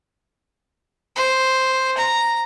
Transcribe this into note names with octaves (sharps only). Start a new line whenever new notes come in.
C5
A#5